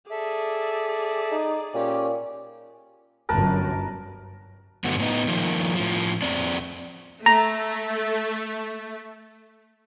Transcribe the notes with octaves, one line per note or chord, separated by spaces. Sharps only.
G#4 A4 D5 E5
D#4
A#2 C#4 G4
G1 F#2 A#4 B4 A5
G2 D3 F#3 A3 B3 F#4
A2 B3 D#4
D#3 F3 A#3
A2 F3
F2 C4 D5
A3 A#5